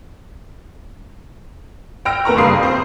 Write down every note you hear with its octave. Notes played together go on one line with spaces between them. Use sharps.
G5 E6 F6 A#6 D7
D#2 A#4 B4 A#5 C#6
F#1 G2 F5 C6 D#6 C7
C4 C5